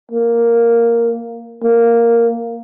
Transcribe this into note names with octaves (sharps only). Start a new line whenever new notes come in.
A#3
A#3